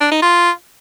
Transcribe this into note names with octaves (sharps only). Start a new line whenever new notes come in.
D4
D#4
F4